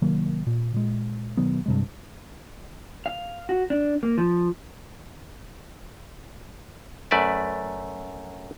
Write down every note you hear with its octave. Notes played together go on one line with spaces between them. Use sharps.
C3 D#3 F#3 A#3
A#2
A#2 G#3
B2 D#3 F#3 B3
G2 C3 G#3
F5
F#4
D4
A#3
F3
F#2 A3 B4 D5 E5